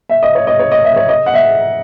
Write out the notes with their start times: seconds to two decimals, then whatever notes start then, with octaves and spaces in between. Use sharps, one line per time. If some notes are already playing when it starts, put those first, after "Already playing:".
0.09 E5
0.23 D#5
0.35 C#5
0.47 D#5
0.59 C#5
0.72 D#5
0.85 E5
0.96 C#5
1.09 D#5
1.26 F#5
1.34 E5